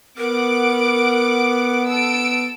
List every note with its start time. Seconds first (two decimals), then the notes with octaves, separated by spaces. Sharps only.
0.18 B3 A#4 F#5 D6 D7
1.88 A4 E6 D7